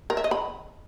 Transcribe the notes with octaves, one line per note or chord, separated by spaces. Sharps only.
A#4
E5
D#5
B5